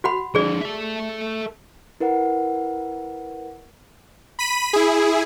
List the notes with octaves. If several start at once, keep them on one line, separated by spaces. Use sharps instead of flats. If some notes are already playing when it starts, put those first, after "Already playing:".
F#4 F#5 B5
D3 F3 G#4 D5
A4 E5
E4 A#4 B4 F#5
B5 B6 D#7
E4 G#4